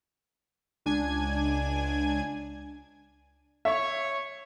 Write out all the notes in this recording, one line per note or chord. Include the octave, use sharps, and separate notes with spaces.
C#2 D4 G#5 G#6
C#5 E5